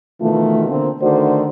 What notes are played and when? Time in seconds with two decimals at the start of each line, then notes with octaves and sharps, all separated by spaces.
0.21 B2 D#3 E3 A3 F4
0.69 D3 A#3 C4
1.01 D3 D#3 A3 F#4 C5 D5